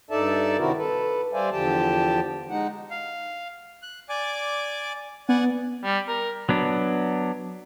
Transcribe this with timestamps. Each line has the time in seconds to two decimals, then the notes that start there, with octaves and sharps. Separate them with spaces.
0.11 G2 D#4 A4 D5 E5 A5
0.58 C3 D#3 C4 E4 F#4 A#4
0.77 A4 B4
1.33 G3 C5 D5 E5 F5 G#5
1.52 E2 D3 F3 G4 G5 A5
2.50 G#3 D#4 F#5
2.91 F5
3.83 F#6
4.09 D5 G#5 D6
5.29 B3 D5 F#5 G#5
5.84 G3
6.08 A#4
6.49 F#3 B3 D4